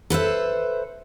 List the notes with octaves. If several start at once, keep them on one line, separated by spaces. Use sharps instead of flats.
A4 B4 C5 E5